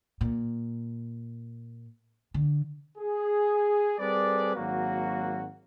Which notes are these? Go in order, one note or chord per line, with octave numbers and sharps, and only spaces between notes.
A#2
D3
G#4
G3 C4 G#4 A4 B4 D5
G#1 F#3 A#3 F#4